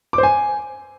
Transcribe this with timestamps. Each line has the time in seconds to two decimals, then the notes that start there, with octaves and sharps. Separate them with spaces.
0.13 D6
0.18 C5
0.23 G#5